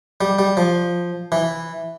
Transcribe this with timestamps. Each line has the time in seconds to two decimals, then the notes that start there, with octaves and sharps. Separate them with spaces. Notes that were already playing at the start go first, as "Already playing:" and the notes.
0.21 G3
0.39 G3
0.57 F3
1.32 E3